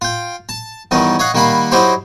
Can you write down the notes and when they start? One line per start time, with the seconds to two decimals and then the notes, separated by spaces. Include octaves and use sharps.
0.01 F4 G5
0.49 A5
0.91 E2 G2 D#3 C#4 D#4
1.19 C#5 D#5 F5 F#5
1.34 D#3 G3 A#3 F5 F#5 B5
1.71 F#3 D#4 E4 G4 C5 F5